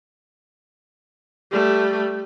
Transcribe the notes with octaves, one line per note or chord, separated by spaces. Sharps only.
G3 A3